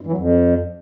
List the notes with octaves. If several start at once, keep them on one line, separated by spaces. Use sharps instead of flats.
G2
E3
F#3
F2